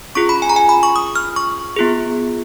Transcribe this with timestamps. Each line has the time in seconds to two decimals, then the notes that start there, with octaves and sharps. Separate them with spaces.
0.15 C#4 F4 G#4 C#6
0.29 B5
0.42 G#5
0.49 A#5
0.56 G#5
0.69 B5
0.83 C#6
0.96 D#6
1.16 F6
1.36 C#6
1.76 B3 F4 G#4